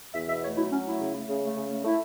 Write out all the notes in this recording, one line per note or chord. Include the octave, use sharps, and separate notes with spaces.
E2 E5
B2 E5
A3 C#5
F#3 E4
F#3 C#4
A3 E4
C#3
A3
C#3
A3
C#3
A3
A3 E4